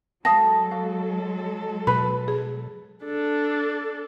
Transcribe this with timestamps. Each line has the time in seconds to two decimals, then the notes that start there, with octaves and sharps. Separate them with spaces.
0.25 F#3 G#3 A4 F5 A5 D#6 A#6
0.71 F#4 F5
1.87 B2 B4 B5
2.28 G#4
3.04 D4 A4